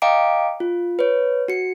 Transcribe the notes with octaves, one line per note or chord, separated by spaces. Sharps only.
D#5 F5 G5 A#5 D6 D7
F4
B4 C#5
F#4 C#7